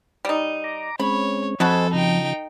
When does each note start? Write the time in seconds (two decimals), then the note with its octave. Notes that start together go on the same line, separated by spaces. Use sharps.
0.25 G3 D#4
0.64 A#5 D6
0.99 G#3 C4 C#4 C#5 B5
1.60 F2 F#4 A4 C5 D#5 G#5 A5 B5
1.94 C#3 F3 D#4 G5